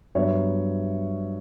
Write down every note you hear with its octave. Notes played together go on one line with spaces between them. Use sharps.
G2 F#3 B3 C#5 E5